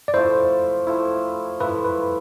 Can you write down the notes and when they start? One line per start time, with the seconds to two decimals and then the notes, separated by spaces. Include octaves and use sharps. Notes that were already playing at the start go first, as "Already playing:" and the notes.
0.08 D5
0.14 F3 A3 E4 C5
0.87 F3 A3 E4
1.60 F3 A3 E4 B4
1.84 B4